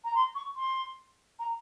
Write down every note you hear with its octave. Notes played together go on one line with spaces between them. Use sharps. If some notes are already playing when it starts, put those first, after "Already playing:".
A#5
C6
C#6
C6
A#5